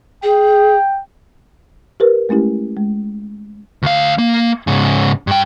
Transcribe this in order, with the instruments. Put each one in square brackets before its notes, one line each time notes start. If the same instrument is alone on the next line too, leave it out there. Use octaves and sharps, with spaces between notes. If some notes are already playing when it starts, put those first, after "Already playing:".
[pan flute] G#4 [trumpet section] G5
[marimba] G4 A#4 B4
G#3 A3 C#4 E4 G4
G#3
[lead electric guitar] D2 F5
A#3
G#2 C#3
G2 G5